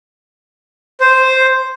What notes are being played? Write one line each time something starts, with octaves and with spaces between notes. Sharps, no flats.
C5